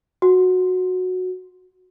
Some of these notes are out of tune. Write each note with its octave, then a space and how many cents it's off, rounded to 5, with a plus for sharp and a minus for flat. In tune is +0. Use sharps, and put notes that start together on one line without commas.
F#4 -10